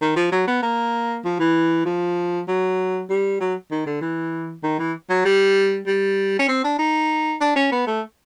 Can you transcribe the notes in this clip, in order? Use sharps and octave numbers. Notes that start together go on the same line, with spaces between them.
D#3
F3
F#3
B3
A#3
F3
E3
F3
F#3
G3
F#3
D#3
D3
E3
D#3
E3
F#3
G3
G3
C#4
C4
D4
D#4
D4
C#4
B3
A3